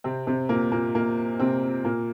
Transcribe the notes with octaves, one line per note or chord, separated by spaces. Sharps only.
C3 C4
C3 C4
A#2 A#3
A#2 A#3
A#2 A#3
C3 C4
A#2 A#3